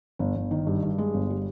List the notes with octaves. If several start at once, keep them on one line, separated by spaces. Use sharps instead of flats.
G1
G1
D#3
G2
G2
G#3
G1
G3